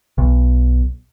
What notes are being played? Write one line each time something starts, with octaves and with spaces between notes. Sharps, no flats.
B1